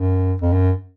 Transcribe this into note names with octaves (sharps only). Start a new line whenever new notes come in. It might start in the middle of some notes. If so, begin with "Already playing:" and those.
Already playing: F#2
F2
F#2